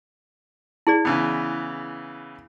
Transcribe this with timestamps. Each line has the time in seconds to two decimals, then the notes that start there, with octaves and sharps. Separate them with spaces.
0.87 E4 G#4 D5
1.05 C#3 E3 B3